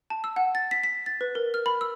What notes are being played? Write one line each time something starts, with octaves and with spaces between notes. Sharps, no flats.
A5
E6
F#5
A6
B6
B6
A6
B4
A#4
F6
B5
E6